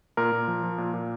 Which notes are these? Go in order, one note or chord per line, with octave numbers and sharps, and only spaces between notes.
A#2 A#4
A#2
F3
F3
A#2
A#2